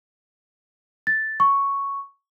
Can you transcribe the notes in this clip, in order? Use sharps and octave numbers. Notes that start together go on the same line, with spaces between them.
A6
C#6